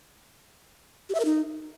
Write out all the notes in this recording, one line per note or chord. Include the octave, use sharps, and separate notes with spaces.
G4
E5
A#4
D#4